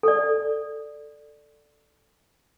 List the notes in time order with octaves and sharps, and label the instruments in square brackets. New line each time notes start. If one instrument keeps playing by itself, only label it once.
[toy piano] A4 D5